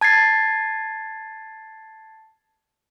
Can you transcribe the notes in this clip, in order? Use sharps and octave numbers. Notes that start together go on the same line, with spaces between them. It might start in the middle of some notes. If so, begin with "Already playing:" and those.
A5 G#6 A6 C7